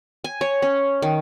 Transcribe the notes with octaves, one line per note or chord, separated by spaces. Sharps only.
G#5
C#5
C#4
D#3